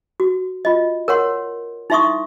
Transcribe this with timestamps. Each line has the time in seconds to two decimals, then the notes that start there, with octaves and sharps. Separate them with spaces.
0.20 F#4
0.65 F4 D#5
1.08 A#4 C#5 F#5 C6
1.90 D#4 E4 E5 C6 C#6 D#6